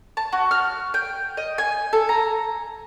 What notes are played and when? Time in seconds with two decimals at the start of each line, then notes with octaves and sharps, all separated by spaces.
0.17 A5
0.32 F#4
0.51 F6
0.94 G5
1.37 D#5
1.58 G#5
1.93 A4
2.09 A#5